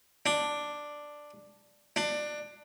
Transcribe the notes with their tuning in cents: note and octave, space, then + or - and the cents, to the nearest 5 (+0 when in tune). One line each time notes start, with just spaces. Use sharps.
D4 +5
D4 +20